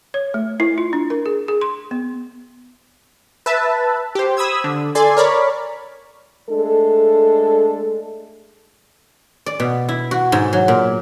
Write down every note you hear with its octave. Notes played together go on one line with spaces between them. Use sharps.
C#5
A3
E4
F4
D4
A#4
G#4
G#4
C6
B3
B4 E5 A5
G4 C5
B5 D#6 E6 G#6
D3
A4 D5 G#5 C6
A#4 C#5 D5 B5
G#3 A3 D4 A4
D5
B2
E4
F#4
G#2
F#3
A#2